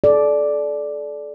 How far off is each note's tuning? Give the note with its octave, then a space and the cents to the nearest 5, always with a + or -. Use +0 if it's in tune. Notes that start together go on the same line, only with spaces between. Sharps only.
A4 -35 D5 +0